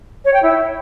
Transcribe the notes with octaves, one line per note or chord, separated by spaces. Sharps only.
C#5
G5
E4